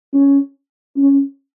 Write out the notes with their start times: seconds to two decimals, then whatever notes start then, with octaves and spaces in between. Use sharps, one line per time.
0.13 C#4
0.96 C#4